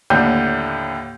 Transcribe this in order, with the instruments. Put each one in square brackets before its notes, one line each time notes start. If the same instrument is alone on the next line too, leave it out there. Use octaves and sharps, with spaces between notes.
[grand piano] D#2 A2 D3 G6